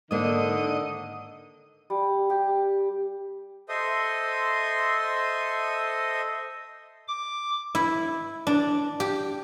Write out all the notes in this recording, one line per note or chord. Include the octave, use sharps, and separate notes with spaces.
G#2 D3 D#3 A#3 D4 D#5
G3
G4
A4 C5 D#5 E5 C6 D#6
D6
E4
D4
G4